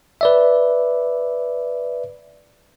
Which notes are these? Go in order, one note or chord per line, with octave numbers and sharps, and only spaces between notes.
B4 D5 E5